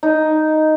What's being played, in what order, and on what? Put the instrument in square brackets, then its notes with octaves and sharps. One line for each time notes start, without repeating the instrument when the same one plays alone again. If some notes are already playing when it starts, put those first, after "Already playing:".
[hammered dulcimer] D#4